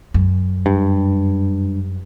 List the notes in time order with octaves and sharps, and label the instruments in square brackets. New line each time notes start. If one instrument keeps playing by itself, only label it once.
[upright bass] F#2
[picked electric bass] G2